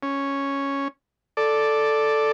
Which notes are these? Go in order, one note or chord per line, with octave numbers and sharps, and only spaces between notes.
C#4
A4 D5